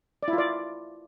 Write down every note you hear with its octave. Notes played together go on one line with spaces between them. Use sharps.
D5
E4
F4
D5